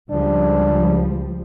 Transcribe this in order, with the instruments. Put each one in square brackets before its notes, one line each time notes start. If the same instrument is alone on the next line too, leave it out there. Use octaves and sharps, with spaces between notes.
[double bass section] C#2 F3 G3 [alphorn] D4